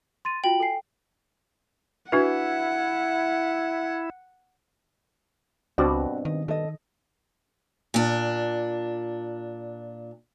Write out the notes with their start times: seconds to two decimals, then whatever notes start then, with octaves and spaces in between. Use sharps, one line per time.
0.25 C6 A6 D#7
0.44 F4 F#4 G5 F#7
0.60 A4 G#5 C7
2.12 D4 E4 F#4 B4 F#5
5.78 C#2 G2 B2 C4 D4 F#4 D5
6.25 D#3 D#5
6.48 D#3 A4 D#5
7.94 A#2 D4